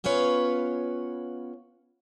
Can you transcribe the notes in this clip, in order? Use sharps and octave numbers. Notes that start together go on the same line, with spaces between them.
B3 C#4 F4 B4 C#5